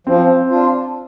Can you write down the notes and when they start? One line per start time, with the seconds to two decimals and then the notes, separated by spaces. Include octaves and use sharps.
0.07 F3 C4
0.50 D4 F4